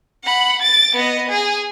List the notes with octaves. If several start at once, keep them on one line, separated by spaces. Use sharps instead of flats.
F#5 B5
A6 D7
B3 D#5
G#4